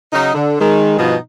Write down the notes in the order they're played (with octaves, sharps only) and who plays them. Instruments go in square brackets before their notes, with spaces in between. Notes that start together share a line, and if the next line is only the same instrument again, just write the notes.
[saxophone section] C#3 F#3 D#4
D3
D#3 G#3
G2 B2 F3 B3 D#4